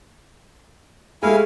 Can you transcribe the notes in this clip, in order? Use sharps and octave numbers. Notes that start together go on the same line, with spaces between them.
G#3 A3 E4 G4 F5 G#5